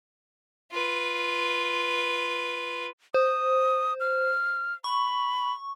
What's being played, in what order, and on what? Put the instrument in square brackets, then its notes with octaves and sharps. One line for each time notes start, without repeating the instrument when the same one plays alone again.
[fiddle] F4 B4
[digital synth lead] C5 [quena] D#6
[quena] F6
[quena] B5 [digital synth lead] C#6